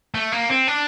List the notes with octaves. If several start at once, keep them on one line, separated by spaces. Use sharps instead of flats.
A3
A#3
C4
D4